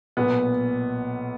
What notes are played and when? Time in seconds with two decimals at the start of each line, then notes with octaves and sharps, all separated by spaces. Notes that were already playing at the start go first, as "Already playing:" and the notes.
0.17 B1 A#2 B3